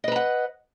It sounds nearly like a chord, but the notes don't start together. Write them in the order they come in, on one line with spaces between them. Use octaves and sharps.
D#5 B4 A#5 F#5